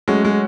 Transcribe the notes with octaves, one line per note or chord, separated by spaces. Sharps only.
F#3 G#3 A3 C#4 F#4
G#3